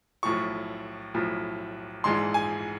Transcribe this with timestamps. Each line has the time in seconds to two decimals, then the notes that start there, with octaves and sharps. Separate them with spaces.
0.23 B1 A2 F3 C#6
1.14 B1 A2 F3
2.04 A#1 G#2 E3 G#3 C6
2.34 G#5